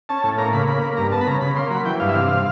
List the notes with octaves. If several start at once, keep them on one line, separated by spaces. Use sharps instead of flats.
C#4 A5
A2
A#3 A#5
C#3 B5
A#3 B5
A#3
G2 A#5
B3 A5
B5
C#3 A#5
C#3 B5
A#3 C6
F#3 B5
E3 G5
G2 F5
E5
C3 F5